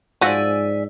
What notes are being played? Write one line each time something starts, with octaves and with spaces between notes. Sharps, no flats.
G#2 F3 F#4 D5 E5 G#5